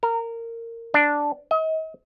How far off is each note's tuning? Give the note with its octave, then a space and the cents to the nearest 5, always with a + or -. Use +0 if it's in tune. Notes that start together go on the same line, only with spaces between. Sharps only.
A#4 -20
D4 +0
D#5 +40